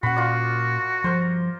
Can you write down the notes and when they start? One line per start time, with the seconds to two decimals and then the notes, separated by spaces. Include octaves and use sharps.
0.03 A#2 C#4 F#4 F#5 B5
0.16 F4 A#4 D5
1.04 G2 F3 A#4 C5